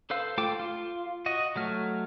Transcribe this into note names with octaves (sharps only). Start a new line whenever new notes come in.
A4 B4 C5 F5 E6
A3 F4 A4 G5 D6
F4
F#4 D#5
F#3 A3 F6